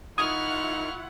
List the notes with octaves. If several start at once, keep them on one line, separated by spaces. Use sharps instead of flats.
D#3 E4 F4 F#5 C#6 D#6 F6 G#6